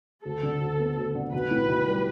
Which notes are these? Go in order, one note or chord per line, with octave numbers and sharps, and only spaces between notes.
D2 A4
D3
D2
B3
D2
D3
B1 B4
A2
B1
G3